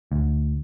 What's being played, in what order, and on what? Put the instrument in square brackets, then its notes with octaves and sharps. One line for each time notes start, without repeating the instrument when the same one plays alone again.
[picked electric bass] D2